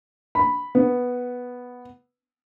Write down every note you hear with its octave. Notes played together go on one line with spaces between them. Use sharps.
B5
B3